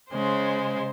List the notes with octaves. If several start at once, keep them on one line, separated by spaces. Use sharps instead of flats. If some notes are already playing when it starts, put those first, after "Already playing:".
C#3 G#3 C5